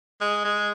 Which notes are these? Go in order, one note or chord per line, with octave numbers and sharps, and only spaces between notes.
G#3
G#3